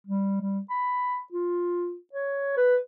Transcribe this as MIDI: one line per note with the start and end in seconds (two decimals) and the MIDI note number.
0.07 0.37 55
0.42 0.60 55
0.70 1.20 83
1.33 1.96 65
2.14 2.55 73
2.57 2.77 71